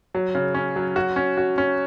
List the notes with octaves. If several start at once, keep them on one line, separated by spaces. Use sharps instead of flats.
F#3
C#3
C#4
F#3
F#4
C#4
F#4
C#4